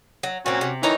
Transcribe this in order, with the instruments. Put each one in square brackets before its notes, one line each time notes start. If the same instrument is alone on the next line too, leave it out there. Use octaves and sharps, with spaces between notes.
[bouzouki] F#3
[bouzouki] A#2 C4 [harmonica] C#4 F#4
[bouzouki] C3
[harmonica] D#3 E3 [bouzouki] D#4 C#5 A#5